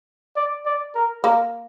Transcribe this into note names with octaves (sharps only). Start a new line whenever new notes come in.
D5
D5
A#4
A#3 A#4